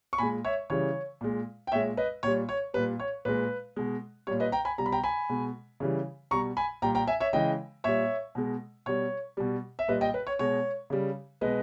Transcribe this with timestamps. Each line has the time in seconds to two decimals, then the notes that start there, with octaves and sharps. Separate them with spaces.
0.13 C#6
0.18 A#2 G#3 G#5 B5
0.45 C#5 E5
0.70 C#3 E3 G3 C#5
1.21 A#2 G#3
1.67 G5
1.72 A#2 G#3 C#5 E5
1.97 B4 D#5
2.23 A#2 G3 C#5
2.49 C#5
2.74 A#2 G3 B4
3.00 C#5
3.25 A#2 G#3 B4
3.76 B2 G#3
4.27 A#2 G3 C#5
4.40 B4 D#5
4.52 G5 A#5
4.65 G#5 B5
4.78 B2 G3 A#5
4.86 B5
4.92 G5 A#5
5.03 G#5 B5
5.29 B2 G#3
5.80 C#3 E3 G3
6.31 B2 G3 A#5 C#6
6.57 G#5 B5
6.82 A#2 G3 G5 A#5
6.95 G5 A#5
7.07 E5 G#5
7.20 C#5 E5
7.33 C#3 E3 G#3 D#5 G5
7.84 A#2 G3 C#5 E5
8.35 B2 G#3
8.86 B2 G3 C#5
9.37 B2 G3
9.79 E5
9.88 A#2 G3 B4 D#5
10.01 D#5 G5
10.14 B4
10.27 C#5
10.39 B2 G#3 C#5
10.90 C#3 G3
11.41 B2 G#3 B4 D#5